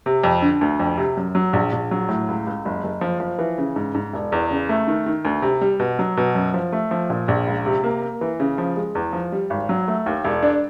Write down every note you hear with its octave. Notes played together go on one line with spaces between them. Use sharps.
C3
F2
D3
D2
F2
C3
F#2
F#3
A#1
A#1
F#3
A2
C#2
C#2
F#1
F#1
F3
F3
E3
C#3
G#2
G#2
E1
E2
C#3
A3
D#3
D#3
D2
C3
G3
B2
F#3
B2
F#2
F3
A3
F3
A#2
A#1
C#2
C3
A#3
A#3
E3
C#3
F3
G#3
E2
F3
G3
G#1
F#3
A3
D#2
E1
D4